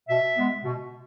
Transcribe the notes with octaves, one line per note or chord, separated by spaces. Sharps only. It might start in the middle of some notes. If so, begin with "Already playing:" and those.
B2 E5
G#3 B3
B2